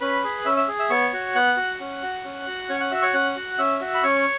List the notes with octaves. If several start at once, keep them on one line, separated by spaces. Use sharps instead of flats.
C#4 B4 B5
G#4
C#4 E5 E6
E5 E6
G#4
E5 E6
B3 C#5 C#6
F#4
B3 F#5 F#6
F#4
C#4
F#4
C#4
F#4
C#4 C#5 C#6
F#5 F#6
F#4 E5 E6
C#5 C#6
C#4 F#5 F#6
F#4
C#4 E5 E6
F#4
B5
C#4 C#5 C#6